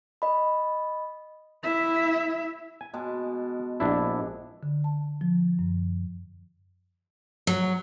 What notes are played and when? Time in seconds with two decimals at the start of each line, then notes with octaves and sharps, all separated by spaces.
0.22 D#5 B5
1.63 E4 E5
2.81 G#5
2.94 B2 G#3 A5
3.80 A#1 D4 E4
4.63 D3
4.84 A5
5.21 F3
5.59 F#2
7.47 F#3